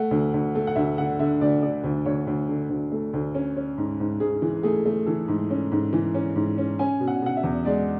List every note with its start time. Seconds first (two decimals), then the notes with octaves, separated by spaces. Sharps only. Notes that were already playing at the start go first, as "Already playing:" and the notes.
Already playing: A3 F#5
0.11 D2
0.34 D2
0.55 A3
0.67 F#5
0.75 D2 E5
0.98 D3 F#5
1.19 D3 E5
1.41 D2 D5
1.62 D3 D5
1.84 D2
2.06 D2 C#5
2.27 D2
2.49 D3
2.70 D2
2.92 A3
3.13 D2
3.35 C#4
3.57 C#4
3.78 G#2
4.00 G#2
4.20 G#2 G#4
4.42 E3
4.63 A3 G#4
4.86 A3
5.06 E3 A4
5.28 G#2
5.51 C#4
5.72 G#2
5.93 E3
6.15 C#4
6.36 G#2
6.58 C#4
6.79 C#4 G#5
7.00 B2
7.07 F#5
7.22 B2 F#5
7.37 E5
7.43 E2
7.65 G#3 D5